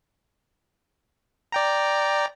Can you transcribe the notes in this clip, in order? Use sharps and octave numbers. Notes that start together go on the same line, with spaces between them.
D5 G5 A#5